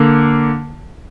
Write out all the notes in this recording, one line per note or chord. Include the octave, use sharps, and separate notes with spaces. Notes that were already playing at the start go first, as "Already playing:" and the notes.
Already playing: D3 A#3